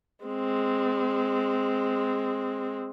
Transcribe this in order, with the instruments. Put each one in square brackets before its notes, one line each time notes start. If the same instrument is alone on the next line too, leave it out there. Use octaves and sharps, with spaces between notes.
[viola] G#3 C4